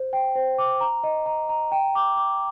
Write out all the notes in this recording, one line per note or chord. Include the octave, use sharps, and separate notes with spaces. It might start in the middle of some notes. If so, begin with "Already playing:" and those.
Already playing: C5
G5
C5
D6
A#5
D#5
A#5
A#5
G5
D6
D6